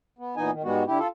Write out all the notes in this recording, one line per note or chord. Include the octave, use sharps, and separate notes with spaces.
B3
A#2 E3 B3 D#4 D#5 G#5
D#3
G#2 G3 G#3 B3 F#4
D3 E4 G4
F4 A4